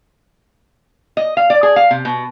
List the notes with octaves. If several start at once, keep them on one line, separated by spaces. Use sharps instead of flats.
D#5
F5
D5
G#4
F5
C3
B2